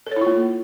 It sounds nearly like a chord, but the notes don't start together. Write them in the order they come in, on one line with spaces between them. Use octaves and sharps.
A4 C#5 E4 F4 A#3